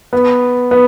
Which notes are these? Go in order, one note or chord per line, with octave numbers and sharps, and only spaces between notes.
B3
B3